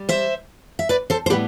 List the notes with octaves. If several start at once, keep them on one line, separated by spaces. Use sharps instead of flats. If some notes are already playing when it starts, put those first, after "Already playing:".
Already playing: G3
C5 E5
E5
B4 D5
A4 C5
C5
A2 G3 B3 G4 B4